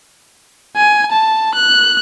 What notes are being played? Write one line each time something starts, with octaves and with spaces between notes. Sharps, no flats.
G#5
A5
F#6